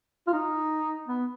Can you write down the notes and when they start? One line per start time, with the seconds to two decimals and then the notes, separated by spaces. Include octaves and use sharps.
0.27 F4
0.33 D#4
1.08 B3